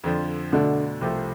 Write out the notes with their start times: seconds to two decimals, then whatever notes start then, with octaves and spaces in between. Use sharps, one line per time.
0.04 F2 D3 F3
0.52 B2 D3 A3 D4
1.01 C2 C3 F3 A3